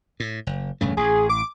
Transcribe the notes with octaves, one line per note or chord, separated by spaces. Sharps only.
A2
F#1
E1 G2 C#3 A3
A1 G#4
D6